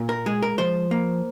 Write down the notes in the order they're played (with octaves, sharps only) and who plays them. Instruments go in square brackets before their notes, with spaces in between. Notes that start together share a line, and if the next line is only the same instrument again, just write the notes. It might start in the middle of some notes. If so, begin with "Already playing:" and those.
Already playing: [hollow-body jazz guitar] A#2
A#4
G#3 G#4
A#4
F3 C5
A#3